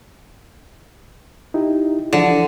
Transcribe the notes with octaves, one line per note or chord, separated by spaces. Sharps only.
D#4 E4 G4
D3 E3 F3 E4